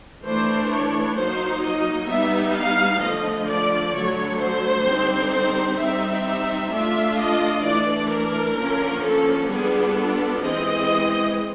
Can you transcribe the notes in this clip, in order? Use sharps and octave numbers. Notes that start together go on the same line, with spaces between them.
E3 A3 D4 C5
C#5
F#3 A#3 D#4 C5
D#5
G3 B3 D#4 E5
F5
D3 F3 A3 D#5
D5
D3 F#3 A3 C#5
C5
D3 G3 C4 D#4
C5
G3 C4 D#4 E5
A3 D4 F4 E5
D#5
E3 A3 D4 D5
A#4
D3 F3 A#3 C#4
A4
G3 B3 D4 F4 G#4
A4
E3 G#3 C4 D#5